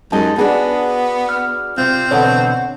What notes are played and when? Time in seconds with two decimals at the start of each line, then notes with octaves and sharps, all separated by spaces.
0.12 F#2 G#3 D#4 G4 A5
0.38 B3 D4 F#4 G#4
1.29 F6
1.78 C3 C4 F4
2.11 B2 D3 E3 C#5 F#5